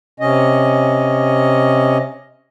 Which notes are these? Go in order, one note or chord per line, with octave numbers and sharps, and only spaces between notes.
C3 C#4 D#5